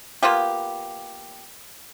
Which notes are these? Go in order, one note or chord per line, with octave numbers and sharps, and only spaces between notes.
A#3 B3 F4 G4